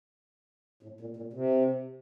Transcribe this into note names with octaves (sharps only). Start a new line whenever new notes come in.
A2
A#2
A#2
C3